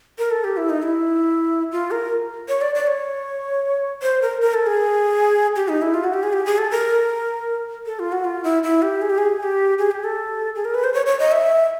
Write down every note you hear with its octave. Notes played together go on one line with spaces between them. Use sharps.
A#4
A4
G4
E4
D#4
E4
F4
A#4
C#5
D5
D5
C#5
C5
A#4
A#4
A4
G#4
G4
D#4
E4
F4
F#4
G4
G#4
G4
G#4
A4
A#4
A4
F4
F#4
F4
E4
E4
G4
G#4
G4
G#4
G#4
G4
G#4
G4
A4
G#4
A#4
B4
C5
C#5
C#5
D#5
E5